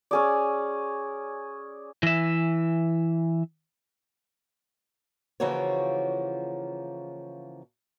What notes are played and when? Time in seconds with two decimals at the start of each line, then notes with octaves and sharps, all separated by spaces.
0.11 C#4 G#4 D5
2.03 E3 E5
5.40 C#3 E3 F3 A#3 F#4 C#5